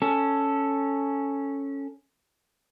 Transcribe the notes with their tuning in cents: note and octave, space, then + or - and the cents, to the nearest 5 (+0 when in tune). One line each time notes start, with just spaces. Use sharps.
C#4 +0 A4 +0